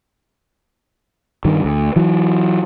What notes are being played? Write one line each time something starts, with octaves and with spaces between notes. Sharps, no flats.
G2 D#3
D2
E3 F#3